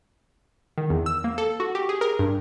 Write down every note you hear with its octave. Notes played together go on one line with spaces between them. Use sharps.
D#3
E2
E6
A#3
A4
F#4
G4
G#4
A#4
G2